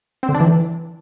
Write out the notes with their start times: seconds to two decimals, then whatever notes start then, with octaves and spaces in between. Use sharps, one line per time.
0.23 C4
0.29 D3
0.34 D4
0.40 E3